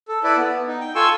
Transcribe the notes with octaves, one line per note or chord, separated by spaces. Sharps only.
A4
E4 A4 B4 D5
B3
D#4
G5
F4 A4 G#5 C6 C#6 E6